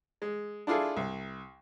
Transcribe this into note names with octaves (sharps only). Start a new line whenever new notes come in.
G#3
D4 E4 F4 G#4 A4
C2